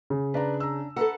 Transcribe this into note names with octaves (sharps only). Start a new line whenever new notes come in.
C#3
D4 B4 D5 A#5
A#5 E6
A4 B4 F#5 A#5 E6